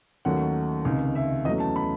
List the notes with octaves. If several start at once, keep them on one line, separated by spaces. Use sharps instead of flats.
D#2 D#3 F#3 A3 C#4 F#5
C#2 C3 D#3
E5
E2 C#3 F#3 A3 D#5
A5
B5